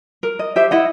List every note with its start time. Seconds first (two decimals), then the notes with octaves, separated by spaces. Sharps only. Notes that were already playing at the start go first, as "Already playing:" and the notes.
0.23 A#4
0.39 D#5
0.56 G4 C5 E5
0.71 E4 D#5 F#5